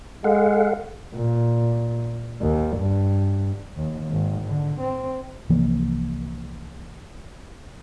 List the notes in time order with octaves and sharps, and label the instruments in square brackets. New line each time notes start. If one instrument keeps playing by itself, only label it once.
[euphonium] G#3 [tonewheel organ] A4 F5 F#5
[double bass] A#2
D#2
G2
D#2
G#1
D3
C4
[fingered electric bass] C2 E3 F3 A#3